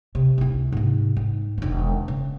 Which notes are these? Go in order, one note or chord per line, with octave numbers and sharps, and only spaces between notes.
C3
C#2 E4
G#2 C3
G#2
E1 D#3
C#3